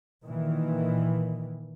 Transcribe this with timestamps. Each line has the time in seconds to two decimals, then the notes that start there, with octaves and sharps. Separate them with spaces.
0.24 A#2 D#3 E3